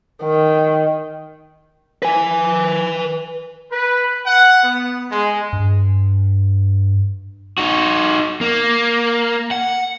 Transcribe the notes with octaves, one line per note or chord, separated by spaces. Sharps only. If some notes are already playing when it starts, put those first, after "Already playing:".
D#3
B4 G#5
B4
F#5
B3
G#3
G2
D#4 F#4
A#3
F#5